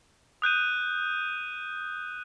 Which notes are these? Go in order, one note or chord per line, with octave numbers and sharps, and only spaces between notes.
D#6 F#6 G6 D#7